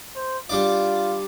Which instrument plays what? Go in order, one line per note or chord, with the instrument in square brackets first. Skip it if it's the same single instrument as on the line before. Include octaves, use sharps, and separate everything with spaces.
[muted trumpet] C5
[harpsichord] G3 D4 D5 [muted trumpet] F4